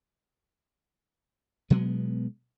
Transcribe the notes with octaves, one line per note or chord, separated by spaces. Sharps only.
B2 F#3 G#3 B3